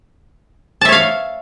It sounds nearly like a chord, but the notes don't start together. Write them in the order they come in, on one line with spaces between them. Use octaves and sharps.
A5 E5 C#5 F5